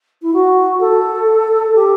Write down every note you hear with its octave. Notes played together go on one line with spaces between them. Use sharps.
E4
F#4
A4
G4